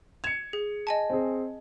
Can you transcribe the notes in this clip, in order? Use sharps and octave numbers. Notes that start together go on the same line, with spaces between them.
G#6 C#7 E7 F7
G#4
D#5 G#5 A5
C4 G#4